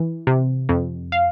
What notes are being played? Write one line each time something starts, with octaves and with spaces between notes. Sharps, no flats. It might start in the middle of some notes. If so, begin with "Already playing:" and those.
Already playing: E3
C3
F2
F5